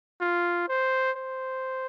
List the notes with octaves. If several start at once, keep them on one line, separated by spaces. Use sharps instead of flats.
F4
C5
C5